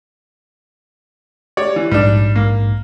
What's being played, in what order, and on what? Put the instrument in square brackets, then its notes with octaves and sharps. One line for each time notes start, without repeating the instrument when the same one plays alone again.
[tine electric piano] G4 [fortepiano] C#5 D5
[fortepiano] E3
[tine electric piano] A#1 G#2 [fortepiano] G3 D4
[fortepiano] A#3